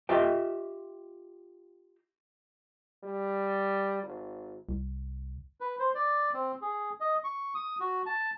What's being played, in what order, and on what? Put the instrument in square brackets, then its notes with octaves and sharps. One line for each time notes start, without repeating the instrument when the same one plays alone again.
[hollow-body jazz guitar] F4 G4 D#5 E5 G5
[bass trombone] G3
G#1
[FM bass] C2
[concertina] B4
C5
D5
C4
G#4
D#5
C#6
D#6
F#4
A5